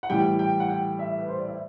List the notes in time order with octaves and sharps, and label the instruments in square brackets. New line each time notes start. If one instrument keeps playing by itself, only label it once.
[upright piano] F#5
A2 E3 G3 G5
G5
F#5
G5
E5
B4
C5
D5
E5